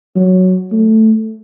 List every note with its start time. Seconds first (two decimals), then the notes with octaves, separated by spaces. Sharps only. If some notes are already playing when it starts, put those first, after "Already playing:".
0.16 F#3
0.72 A3